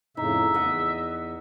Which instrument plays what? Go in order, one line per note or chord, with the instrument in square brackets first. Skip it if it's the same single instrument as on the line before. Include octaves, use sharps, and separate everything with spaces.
[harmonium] F2 A2 C#3 [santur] D#4 [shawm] E5
[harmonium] E2 [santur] D#5 F#5